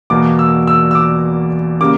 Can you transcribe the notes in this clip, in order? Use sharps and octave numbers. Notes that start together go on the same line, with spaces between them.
E2 B2 A#3 D6
E6
E6
E6
D6
C#3 G3 A#3 D6